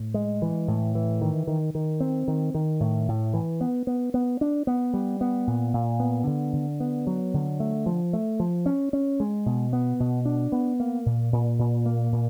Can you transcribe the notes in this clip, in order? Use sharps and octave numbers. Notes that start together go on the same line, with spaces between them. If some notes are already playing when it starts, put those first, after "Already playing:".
Already playing: A2
G#3
E3
A2
E3
D#3
D#3
D#3
C4
D#3
D#3
A2
A2
E3
B3
B3
B3
D4
B3
G3
B3
A#2
A#2
B3
D3
D3
B3
F#3
D3
A3
F3
A3
F3
C#4
C#4
G#3
B2
B3
B2
D4
B3
A#3
A#2
A#2
A#2
A#3
A#2